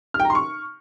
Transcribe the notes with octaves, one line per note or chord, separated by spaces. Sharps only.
F6
G5
A#5
C6
C#6